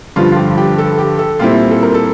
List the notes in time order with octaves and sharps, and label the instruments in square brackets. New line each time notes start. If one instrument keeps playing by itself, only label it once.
[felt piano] G2 D3 F3 F4
F4
G4
G4
A4
G4
A4
A#2 G3 C4 E4 F4
A4
A#4
A4